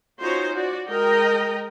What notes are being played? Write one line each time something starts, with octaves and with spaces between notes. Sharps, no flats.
C#4 D#4 F4 F#4 C5 C#5
F#4 D5
G#3 A#4 D#5 G5 A#5